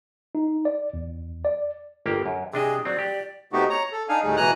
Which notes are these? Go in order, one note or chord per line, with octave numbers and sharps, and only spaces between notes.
D#4
D5
E2
D5
G1 A#3 G4
F#2
C3 D4 G#4 D#5
F#3 C4 D5
G4
C3 A3 B3 D#4 F#4 G4
C#5 A#5
A4
D4 D#4 F5 G#5
D2 A2 G3 D#4 G#4
B2 E3 G#5 A#5 F#6